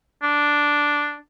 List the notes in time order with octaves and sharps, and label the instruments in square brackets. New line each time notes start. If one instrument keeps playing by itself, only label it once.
[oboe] D4